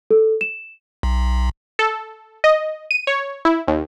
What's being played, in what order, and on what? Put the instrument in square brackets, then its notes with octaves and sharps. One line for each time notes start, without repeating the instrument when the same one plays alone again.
[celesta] A4
E7
[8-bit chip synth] B1
[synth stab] A4
D#5
D#7
C#5
E4
D#2